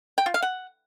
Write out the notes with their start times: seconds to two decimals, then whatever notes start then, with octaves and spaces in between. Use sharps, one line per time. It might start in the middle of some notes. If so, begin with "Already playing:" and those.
0.18 G5
0.26 F4
0.34 F5
0.42 F#5